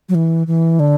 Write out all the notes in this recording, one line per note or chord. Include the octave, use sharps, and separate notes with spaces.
F#3
E3
E3
D3